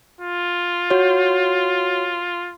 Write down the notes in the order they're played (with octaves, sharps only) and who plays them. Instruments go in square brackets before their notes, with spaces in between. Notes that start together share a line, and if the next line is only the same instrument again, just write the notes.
[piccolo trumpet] F4
[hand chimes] F#4 C#5